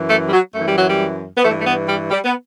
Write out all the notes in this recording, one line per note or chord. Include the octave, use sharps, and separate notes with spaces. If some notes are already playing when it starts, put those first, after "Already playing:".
Already playing: F#2 E3
A3
G3
F#3
F#2 E3 A3
G3
F#3
G3
B3
G2 E3 A3
A3
B3
G3
G3
B3